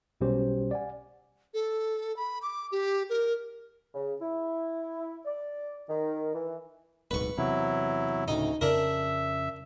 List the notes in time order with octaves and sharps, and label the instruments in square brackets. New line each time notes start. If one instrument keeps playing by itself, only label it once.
[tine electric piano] B1 B2 G3 C#4 G4 C5
D5 F#5 G#5
[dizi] A4
B5
D6
G4
A#4
[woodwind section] C#3
E4
D5
D#3
E3
[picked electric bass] D1 B1 G#2 [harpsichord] B4 C#6
[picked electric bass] E2 C3 [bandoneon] F#3 E4
[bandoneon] D2 [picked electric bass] A2 C#3 [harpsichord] D#4
[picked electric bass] F2 C#3 C#4 [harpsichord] D4 A#4 [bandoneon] E5